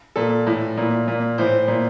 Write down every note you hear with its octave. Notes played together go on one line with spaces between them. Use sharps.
A#2 A4
A2 E3
A#2
A#2
A2 E3 C5
A#2